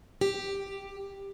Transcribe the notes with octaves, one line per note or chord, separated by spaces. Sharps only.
G4